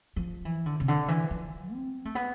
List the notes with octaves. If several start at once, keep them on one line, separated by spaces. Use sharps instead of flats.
F3
E3
D3
C3
D3
E3
F3
C4
A3
B3